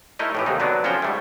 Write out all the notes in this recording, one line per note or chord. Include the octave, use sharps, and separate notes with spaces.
A3 D#4 E4 A#4 D#5
A2 E3 G4
D#2 C3 D#4
D3 F#3 B3 D4
F3 C#4 F#4 C5 G5
G#2 G3 A3